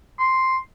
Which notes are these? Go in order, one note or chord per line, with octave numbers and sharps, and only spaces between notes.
C6